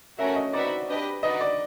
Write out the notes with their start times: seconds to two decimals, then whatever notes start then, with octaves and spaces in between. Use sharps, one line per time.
0.18 A3 C#4 F#4 A#4 C#5 E5
0.36 D#5
0.53 C4 D#4 F#4 B4 D5 E5
0.88 D4 G4 B4 D#5
1.23 D#4 F#4 B4 D5 D#5
1.41 D5